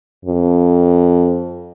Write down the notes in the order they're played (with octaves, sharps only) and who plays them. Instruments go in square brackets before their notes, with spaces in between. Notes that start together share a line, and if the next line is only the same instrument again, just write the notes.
[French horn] F2